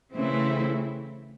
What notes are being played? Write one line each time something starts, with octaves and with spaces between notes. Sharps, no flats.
C#3 E3 A3 C4 E4